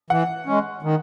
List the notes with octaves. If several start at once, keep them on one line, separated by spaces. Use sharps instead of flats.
E3 F#5
G#3 C#4
D#3